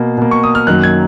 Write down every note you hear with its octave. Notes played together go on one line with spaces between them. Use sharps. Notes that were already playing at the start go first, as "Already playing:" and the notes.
Already playing: B2 A#3
B2 A#3
C#6
D#6
F6
F#2 D#3 F#3 A#3 F#6
G#6